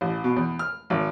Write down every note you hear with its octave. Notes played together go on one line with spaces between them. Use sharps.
A1
B2
E2
F6
G#1